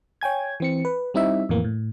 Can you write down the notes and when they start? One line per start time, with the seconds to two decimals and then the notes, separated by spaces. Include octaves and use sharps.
0.21 C#5 G5 G#5 G#6
0.60 E3 C4 C#7
0.85 B4
1.14 G3 C4 D#4 E4 E5
1.49 F2 A2 E3 A#3
1.64 A2